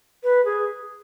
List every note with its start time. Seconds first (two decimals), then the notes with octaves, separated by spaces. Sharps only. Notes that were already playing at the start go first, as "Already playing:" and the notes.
0.23 B4
0.45 G#4